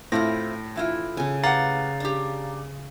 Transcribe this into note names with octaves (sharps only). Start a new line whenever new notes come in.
A2 C4 E4 F4 A#6
E3 E4 F4
C#3 G#5
G4 B4 F5 F#5 A#5 A6
D4 G4